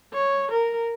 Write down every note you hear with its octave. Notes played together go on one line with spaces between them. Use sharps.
C#5
A#4